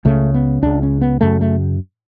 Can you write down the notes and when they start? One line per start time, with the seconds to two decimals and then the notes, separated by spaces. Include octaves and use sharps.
0.05 C#2 C#3 A3
0.34 B3
0.62 C#2 C#3 D4
0.83 C#4
1.01 B3
1.21 F#2 C#3 A3
1.41 A3